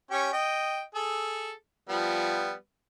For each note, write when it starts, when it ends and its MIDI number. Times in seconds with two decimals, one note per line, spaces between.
0.11 0.30 61
0.11 0.30 67
0.11 0.30 73
0.33 0.82 75
0.33 0.82 79
0.95 1.52 68
0.95 1.52 69
1.89 2.53 53
1.89 2.53 55
1.89 2.53 59